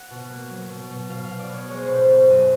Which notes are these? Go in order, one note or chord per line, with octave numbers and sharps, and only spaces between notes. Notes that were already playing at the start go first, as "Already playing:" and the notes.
Already playing: F#5
B2
A#3
F#3
B2
B2
B2 F5
F5
B2
D5
B3 C#5
G#3 C#5
C5
B2 B4
C5
B2
F#2